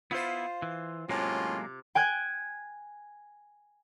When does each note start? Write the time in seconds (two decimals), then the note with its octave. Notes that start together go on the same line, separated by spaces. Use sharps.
0.11 B3 E4 F4 C5
0.62 E3
1.09 A2 C3 F#3 G#3 A#3 C#4 F4
1.95 G5 G#5 F#6 G#6